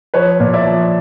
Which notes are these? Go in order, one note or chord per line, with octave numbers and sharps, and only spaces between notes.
F3 B4 C#5
A#2
D5 E5
F3